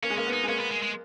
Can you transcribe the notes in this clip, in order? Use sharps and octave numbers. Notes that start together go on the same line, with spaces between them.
A#3 C#4
G#3
A#3 C#4
B3
D#4
G#3
A#3 C#4
B3
G#3
G#3